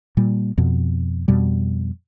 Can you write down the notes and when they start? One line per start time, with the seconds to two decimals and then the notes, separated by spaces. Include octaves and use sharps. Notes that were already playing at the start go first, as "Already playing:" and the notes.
0.17 A#2 G3
0.58 F2 B2
1.28 F2 B2 G3